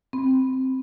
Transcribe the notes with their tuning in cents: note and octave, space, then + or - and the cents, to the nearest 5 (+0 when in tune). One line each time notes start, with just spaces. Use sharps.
C4 +0 B5 +0